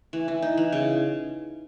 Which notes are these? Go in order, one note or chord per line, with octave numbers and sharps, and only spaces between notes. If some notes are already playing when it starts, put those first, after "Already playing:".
E3
E3
D#4
E3
C#3